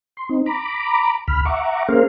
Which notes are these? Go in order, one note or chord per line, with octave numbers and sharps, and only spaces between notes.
C6
C4 D#4
A#5 B5 D6
D2 B5 F6
E5 F#5 A#5 C#6 D6
A#3 C#4 G#4 A#4 C5 F5